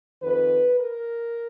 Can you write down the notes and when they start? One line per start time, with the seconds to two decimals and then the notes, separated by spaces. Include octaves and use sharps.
0.22 F2 D#3 B4
0.80 A#4